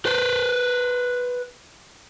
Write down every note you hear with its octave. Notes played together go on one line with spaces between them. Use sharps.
B4 C5